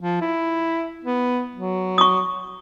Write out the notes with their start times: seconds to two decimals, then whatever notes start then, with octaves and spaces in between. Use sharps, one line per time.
0.02 F3
0.21 E4
1.04 B3
1.56 F#3
1.98 C#6 D#6